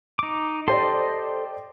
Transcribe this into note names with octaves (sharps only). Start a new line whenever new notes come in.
D#4 D6
G4 A4 C5 D5 D#5 C6